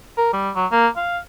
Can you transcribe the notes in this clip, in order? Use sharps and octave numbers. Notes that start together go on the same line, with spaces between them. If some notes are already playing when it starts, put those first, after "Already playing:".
A#4
G3
F#3
A#3
F5